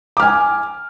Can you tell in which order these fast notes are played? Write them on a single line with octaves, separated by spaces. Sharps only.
D6 F6 G#5